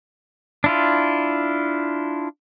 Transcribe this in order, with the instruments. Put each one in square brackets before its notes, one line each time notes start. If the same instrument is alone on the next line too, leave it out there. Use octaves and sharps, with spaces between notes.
[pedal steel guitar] D4 E4 F4